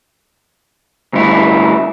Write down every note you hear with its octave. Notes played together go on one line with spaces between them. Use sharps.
D2 G2 E4